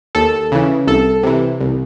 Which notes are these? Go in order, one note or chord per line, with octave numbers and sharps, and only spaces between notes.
D#2 A4
C#3 E3
C2 A4
C3 E3
C2